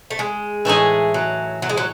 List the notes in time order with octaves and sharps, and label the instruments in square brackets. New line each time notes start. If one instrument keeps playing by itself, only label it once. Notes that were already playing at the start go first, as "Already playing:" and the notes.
[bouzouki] A3
G#3
[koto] A2 E3 A3 D#4 G#4
[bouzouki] F#3
F#3
G#3
F#3